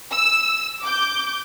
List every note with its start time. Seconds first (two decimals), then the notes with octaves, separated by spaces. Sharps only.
0.11 E6
0.82 D6 G6